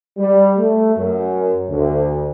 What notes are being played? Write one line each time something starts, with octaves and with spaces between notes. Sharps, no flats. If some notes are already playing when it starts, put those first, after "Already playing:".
G3
A3
F#2
D2